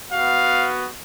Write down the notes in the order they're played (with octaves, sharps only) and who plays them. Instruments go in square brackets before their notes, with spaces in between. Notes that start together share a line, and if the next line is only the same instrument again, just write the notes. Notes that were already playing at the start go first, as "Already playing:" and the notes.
[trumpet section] B3 F#4 F5